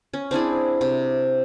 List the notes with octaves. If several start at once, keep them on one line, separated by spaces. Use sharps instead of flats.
C#4
C4 D4 E4 G#4
C3